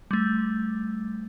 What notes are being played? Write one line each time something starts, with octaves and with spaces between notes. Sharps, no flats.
G3 A3